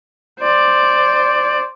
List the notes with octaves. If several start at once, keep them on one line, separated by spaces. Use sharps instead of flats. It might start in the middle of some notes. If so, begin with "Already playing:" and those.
C5 D5